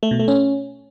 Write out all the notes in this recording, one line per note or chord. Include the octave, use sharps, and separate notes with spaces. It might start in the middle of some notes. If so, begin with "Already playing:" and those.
A3
B2
A3
C#4